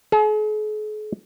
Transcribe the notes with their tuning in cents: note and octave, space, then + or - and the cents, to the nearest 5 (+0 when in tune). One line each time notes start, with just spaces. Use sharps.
G#4 +45 A#5 +0